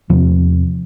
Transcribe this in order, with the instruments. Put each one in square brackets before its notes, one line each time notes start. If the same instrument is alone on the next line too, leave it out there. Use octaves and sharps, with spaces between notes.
[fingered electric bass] E2 C3 F3